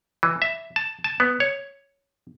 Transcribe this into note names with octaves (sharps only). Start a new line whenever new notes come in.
E3
E5
A5
A5
B3
C#5